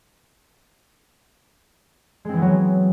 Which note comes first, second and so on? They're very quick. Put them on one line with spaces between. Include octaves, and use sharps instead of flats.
G#3 C4 E3 B3 F#3